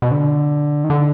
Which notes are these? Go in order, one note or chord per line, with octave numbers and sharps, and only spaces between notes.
B2
D3
D#3
D3